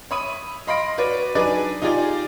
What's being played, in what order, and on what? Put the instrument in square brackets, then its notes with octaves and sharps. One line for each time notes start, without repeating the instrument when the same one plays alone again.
[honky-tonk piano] C#5 E5 B5 D#6 D#7
D#5 F5 B5 C6 A#6 D7
F#4 B4 C#5 D5
F#3 D4 D#4 G#4 B4 D5
D#4 F4 G4 G#4 D5 G5